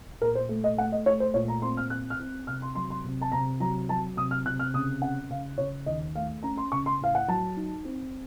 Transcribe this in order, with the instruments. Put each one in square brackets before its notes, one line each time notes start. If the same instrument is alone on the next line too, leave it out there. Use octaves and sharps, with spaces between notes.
[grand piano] A#2 A#4
C5
A3
D#5
A3 F#5
D#5
A3 C#5
C5
A#2 C#5
A#5
C4 C6
F6
C4 F#6
F6
C4
C3 F6
C6
F#3 C6
C6
C3
A5
C3 A#5
F#3 A#5
F#3 A5
C3 D#6
F6
C3 F#6
F6
C#3 D#6
C#4 F#5
C#3 F5
C#3 C#5
D#2 D#5
A3 F5
C#4 A#5
C6
C#3 C#6
C6
A2 F5
F#5
F#3 A5
D#4
C4